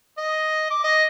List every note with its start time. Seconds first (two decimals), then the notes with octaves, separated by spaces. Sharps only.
0.18 D#5
0.70 D6
0.84 D#5